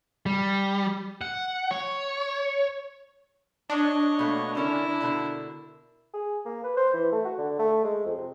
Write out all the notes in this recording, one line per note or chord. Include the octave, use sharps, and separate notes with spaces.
G3
F#5
C#5
D4 C#5 D#5
B2 A3 A#3
D3 C#4 E4 A#4 D5
B2 D3 A5
G#4
A#3
B4
C5
E3
A3
F#4
D3
A3
G#3
F2
C3